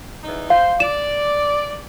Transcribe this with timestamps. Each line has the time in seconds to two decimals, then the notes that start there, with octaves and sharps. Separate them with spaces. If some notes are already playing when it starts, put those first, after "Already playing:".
0.24 E2 D#4
0.50 C5 F5
0.80 D5 E7